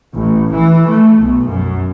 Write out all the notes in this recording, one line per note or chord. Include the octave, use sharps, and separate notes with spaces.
A1
E3
A3
B1
F#2